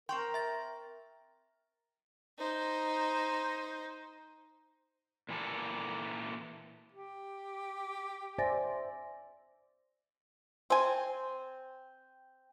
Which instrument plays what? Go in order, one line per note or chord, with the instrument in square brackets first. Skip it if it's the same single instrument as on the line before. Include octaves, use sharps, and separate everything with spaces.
[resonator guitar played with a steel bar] C4 G5 [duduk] A#4 [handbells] C6 C#6
[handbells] E5 A6
[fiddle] D#4 C5
[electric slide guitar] A#2 E3 A#3 A4
[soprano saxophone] G4
[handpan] C5 D5 E5 [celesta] G#5 A6 A#6
[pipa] C4 G#5